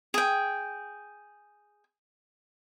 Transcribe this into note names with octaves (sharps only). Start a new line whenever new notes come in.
G#4 G5